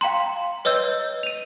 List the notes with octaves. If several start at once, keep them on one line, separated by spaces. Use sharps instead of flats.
F5 G5 A#5 C6
B4 C#5 D#5 E6 G6
D#7 F7